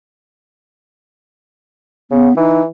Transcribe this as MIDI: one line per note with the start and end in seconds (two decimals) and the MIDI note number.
2.11 2.29 49
2.11 2.37 59
2.37 2.66 52
2.37 2.62 63